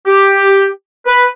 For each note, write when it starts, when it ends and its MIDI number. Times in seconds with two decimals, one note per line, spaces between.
0.07 0.68 67
1.07 1.27 71